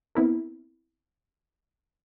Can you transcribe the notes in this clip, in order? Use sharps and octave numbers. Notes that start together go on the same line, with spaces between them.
B3 C4 E4 A#4